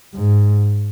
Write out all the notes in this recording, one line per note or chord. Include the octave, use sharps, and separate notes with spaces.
G#2